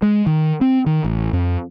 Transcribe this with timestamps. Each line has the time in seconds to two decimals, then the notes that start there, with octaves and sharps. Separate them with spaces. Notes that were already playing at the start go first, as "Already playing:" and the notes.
0.02 G#3
0.26 D#3
0.61 C4
0.86 D#3
1.04 A1
1.33 F2